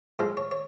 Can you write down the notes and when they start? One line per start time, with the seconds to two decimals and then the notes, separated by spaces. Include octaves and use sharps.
0.19 A2 F3 G#3 C5
0.37 C#5
0.51 C#5